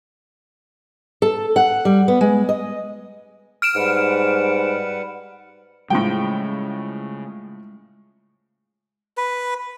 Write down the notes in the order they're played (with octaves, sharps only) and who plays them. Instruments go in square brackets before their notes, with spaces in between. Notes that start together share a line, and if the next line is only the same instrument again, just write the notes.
[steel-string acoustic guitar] A4
F#5
G3
B3
G#3
D#5
[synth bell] F6 D7 E7
[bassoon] G#2 [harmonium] G3 B4 F#5
[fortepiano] A2 F3 G5 [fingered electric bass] C#3 [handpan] G3 G#3
[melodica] B4